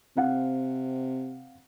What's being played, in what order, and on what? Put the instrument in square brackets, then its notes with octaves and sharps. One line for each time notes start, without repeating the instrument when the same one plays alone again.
[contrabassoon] C3 [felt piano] C4 F5 F#5